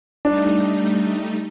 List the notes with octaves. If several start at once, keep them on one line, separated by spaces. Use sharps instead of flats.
G3 A3 D4 D#4